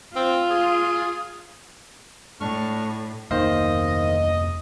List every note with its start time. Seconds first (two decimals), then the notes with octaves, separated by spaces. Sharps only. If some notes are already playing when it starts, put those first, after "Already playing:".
0.16 C4 F4
0.50 G#4
2.40 A2 D4 C#6 F6
3.31 F1 D#3 A#3 B3 C5 D#5 F5